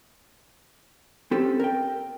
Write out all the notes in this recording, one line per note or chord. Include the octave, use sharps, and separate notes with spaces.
C4 C#4 G4 A4
A#4 G5